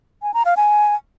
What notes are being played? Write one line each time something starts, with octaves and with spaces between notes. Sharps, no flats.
G#5
A#5
F5
G#5